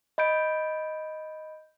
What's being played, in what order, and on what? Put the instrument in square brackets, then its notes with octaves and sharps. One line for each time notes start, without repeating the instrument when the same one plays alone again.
[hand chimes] D#5 B5 G6 D7